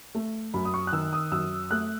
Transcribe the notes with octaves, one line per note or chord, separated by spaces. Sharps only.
A3
F#2 B5
D#6
C#6
F#6
D#3 E6
D#6
F#2 E6
A3 F#6